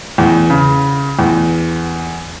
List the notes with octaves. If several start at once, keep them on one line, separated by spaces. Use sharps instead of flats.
E2
C#3
E2